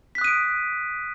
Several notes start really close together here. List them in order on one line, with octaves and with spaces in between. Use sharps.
B6 F#6 D#6 D#7 D7